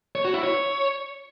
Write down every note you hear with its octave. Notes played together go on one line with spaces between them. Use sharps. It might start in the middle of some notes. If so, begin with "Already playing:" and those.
C#5
F#4
E4
C#5